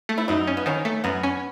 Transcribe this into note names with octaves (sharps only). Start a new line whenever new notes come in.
A3
E4
F#2 D#4
C#4
B3
D#3 C#4
A3
F#2 B3
C#4